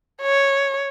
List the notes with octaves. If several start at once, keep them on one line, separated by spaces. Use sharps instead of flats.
C#5